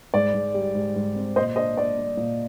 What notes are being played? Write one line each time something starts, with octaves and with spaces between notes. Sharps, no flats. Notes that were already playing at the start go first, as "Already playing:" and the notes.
G#2 D5
G#2
G3
G#2
G#2
C4
A#2 C5 D#5
D4 C5 D#5
D4 D5
D4
A#2